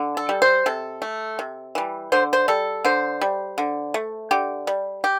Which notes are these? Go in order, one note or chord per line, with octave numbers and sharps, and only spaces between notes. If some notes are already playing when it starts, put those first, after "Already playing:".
Already playing: D3
A4
G3
C5
C3 A4
A3
C3
E3 G3
D3 C5
C5
G3 A4
D3 C5
G3
D3
A3
D3 G4
G3
G4